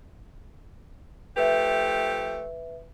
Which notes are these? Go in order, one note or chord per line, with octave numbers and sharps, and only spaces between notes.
F3 A3 G4 B4 E5